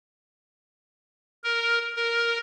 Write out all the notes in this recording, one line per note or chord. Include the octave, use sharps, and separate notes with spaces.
A#4
A#4